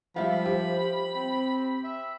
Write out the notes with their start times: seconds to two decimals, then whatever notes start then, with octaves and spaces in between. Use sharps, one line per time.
0.16 F3 G3 E5 F5 B5
0.45 G4 C5
1.16 C4
1.84 E5